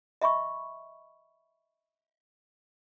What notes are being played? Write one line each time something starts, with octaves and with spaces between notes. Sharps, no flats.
D#5 E5 B5 C#6